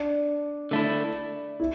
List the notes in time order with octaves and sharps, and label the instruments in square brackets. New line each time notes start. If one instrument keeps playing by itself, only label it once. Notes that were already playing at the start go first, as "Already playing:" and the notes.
Already playing: [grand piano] D4
[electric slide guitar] D3 A3 E4
[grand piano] E4